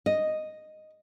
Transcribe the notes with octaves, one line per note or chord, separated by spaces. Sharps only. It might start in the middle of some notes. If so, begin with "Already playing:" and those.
D#5